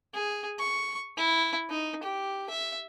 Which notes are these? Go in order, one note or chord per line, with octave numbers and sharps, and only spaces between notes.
G#4
C#6
E4
D#4
G4
E5